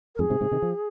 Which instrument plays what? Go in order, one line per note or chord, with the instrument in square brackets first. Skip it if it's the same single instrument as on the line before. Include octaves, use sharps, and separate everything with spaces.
[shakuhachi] A#4
[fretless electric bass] F2 G#2 [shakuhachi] G#4
[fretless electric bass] G#2 C3
G#2 C3
C3 D#3
F3